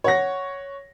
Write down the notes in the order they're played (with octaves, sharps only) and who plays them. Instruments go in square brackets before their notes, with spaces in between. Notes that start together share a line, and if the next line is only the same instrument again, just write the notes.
[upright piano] C#5 F#5 A#6